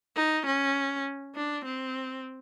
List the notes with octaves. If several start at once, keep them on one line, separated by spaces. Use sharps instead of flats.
D#4
C#4
D4
C4